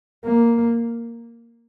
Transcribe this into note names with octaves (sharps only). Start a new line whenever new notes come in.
A#3